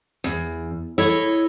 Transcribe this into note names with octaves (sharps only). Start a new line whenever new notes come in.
E2
E4 A4 C#5 D#5